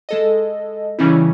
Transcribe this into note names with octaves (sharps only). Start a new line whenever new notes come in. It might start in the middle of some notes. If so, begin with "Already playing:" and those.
G#3 A4 D#5
C#3 E3 G3 C#4 D#4 E4